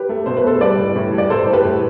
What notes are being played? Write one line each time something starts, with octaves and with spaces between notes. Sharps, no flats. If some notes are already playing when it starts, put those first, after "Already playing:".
Already playing: G4 B4
A3
B2 C5
B4
A3 A4 C5
G3 B4 D5
A2
A2
G3
D5
A2 A4 C5
A2 C5
G4 B4
A2